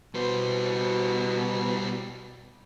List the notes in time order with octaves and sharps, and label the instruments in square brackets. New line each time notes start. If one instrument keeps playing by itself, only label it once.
[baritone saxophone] B2 [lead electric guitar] G3 C5